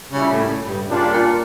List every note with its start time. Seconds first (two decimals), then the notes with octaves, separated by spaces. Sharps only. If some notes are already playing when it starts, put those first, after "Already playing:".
0.12 A#2 C#3 G3 C#4 E4
0.31 A2
0.68 G2
0.87 A#2 C#3 G3 A#3 D4 F4
1.12 A#2